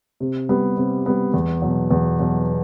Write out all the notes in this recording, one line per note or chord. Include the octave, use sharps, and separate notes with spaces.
C3
G3 B3
C3
G3 B3
E2
B2 F#3
E2
B2 F#3